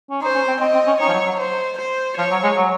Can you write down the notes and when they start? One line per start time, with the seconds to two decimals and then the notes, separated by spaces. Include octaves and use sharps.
0.10 C#4
0.22 D#4 C5
0.35 C#4
0.48 C4
0.60 C4 D#5
0.74 C4
0.87 C#4
1.00 D#4 C#5
1.08 F3
1.13 F#3
1.26 F#3
1.40 C5
1.78 C5
2.17 F3 C#5
2.31 F#3
2.43 G#3
2.56 F#3